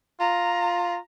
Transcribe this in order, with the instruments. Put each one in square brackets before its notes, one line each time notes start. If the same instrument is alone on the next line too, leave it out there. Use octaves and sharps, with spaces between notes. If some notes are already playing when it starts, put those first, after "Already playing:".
[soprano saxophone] F4 [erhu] A#5